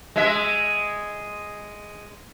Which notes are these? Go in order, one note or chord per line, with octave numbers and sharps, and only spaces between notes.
G#3 E5